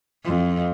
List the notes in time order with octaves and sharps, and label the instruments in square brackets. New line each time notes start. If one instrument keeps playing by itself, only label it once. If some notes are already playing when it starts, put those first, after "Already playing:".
[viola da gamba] F2